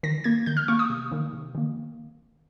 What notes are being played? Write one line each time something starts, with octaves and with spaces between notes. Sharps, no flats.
D#3 A#6
A#3 G#6
D#3 G6
F6
A#3 C#6
D#6
C3
D#3 A#3
C3
D#3 A#3